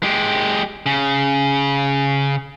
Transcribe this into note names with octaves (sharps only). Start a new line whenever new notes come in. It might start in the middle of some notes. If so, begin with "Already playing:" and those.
G#3 G4
C#3